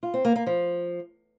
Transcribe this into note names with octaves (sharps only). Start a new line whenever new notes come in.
F4
C4
A#3
A#3
F3